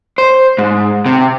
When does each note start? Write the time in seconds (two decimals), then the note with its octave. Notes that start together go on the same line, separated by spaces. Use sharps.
0.18 C5
0.58 G#2
1.06 C3